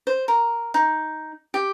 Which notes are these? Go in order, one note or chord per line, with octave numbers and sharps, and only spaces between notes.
C5
A#4
D#4
G4